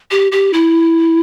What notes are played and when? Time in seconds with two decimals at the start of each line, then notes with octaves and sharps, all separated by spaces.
0.11 G4
0.32 G4
0.53 E4